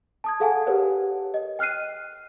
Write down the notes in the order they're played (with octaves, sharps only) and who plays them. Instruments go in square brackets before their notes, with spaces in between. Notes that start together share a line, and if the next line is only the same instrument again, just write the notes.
[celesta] A5 D#6 G#6
G#4 A4 F5 F#5 G#5 A5
G4 G#4 A#4 B4 C#5 F#5
D#5
G5 F6 F#6 C7 D#7